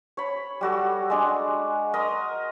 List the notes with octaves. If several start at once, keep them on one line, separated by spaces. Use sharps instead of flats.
C#5 B5
G3 F#4 A4
G#3 D4
A#4 D#5 C6 D#6